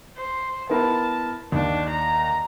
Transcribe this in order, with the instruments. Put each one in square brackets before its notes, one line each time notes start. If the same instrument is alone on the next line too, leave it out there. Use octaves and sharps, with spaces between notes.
[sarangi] C5
[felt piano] B3 E4 A#4 [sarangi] A5
[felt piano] D#2 [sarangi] D4
[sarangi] A#5